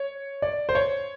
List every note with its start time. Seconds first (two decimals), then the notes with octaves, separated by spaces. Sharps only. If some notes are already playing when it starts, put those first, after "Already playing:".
Already playing: C#5
0.42 D5
0.69 C5
0.75 C#5